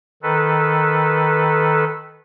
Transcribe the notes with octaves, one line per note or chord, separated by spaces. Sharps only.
D#3 A4 B4